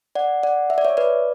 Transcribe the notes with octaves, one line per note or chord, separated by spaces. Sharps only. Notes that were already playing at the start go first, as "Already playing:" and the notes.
D5 F#5
D5 F#5
E5
D5
C#5 E5
B4 D5